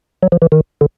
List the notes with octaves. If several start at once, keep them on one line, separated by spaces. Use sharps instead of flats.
F#3
F3
E3
D#3
D3